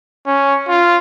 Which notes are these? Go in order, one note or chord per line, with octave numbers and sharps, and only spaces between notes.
C#4
F4